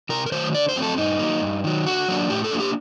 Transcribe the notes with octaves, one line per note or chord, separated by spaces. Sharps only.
C3 A#4
A#4
D#3 F#3 A3 C5
D3 D5
C5
F#3 A3 C4
A4
G2 D#4
F#3 A#3
G2
D#3 F#3
D3 F#4
F#3 A#3 D4
A2 G4
A4
F#3 A#3 D4
G4